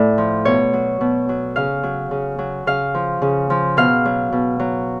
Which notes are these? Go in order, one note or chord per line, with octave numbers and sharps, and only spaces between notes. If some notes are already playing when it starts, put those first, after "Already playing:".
Already playing: A2 D5
F3
B2 C#5
F#3
B2
F#3
C#3 F5
F#3
C#3
F#3
C#3 F5
F3
C#3
F3
B2 F5
F#3
B2
F#3